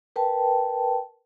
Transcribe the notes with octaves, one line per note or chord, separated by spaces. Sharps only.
A#4 B4 G5 A5